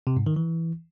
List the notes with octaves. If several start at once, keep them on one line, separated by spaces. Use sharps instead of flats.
C3
G#2
D#3
E3